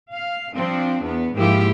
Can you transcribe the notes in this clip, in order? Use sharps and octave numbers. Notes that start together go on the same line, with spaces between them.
F5
F3 C4 D4
E2 B3
G#2 F3 A#3 E4 G4